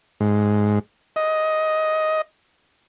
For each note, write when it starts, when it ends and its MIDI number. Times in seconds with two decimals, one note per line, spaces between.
0.20 0.79 44
1.16 2.22 75